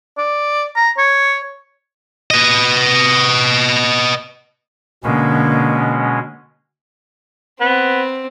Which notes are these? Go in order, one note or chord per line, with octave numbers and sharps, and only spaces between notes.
D5
A#5
C#5
B4 D#5
B2 D3 G#3 A#3 C#4
B3 C4